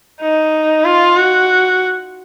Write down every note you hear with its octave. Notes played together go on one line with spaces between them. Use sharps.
D#4
F4
F#4